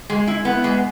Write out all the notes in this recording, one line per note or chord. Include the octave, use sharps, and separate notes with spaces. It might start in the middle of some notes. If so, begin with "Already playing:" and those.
G#3
E4
B3
G#3